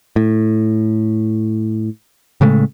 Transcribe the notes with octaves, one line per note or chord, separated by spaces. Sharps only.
A2
A2 C#3 G#3 A3